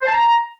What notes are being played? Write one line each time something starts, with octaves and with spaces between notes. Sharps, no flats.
C5
A5
A#5